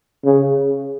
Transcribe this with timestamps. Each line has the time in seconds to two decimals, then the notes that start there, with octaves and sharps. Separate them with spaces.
0.25 C#3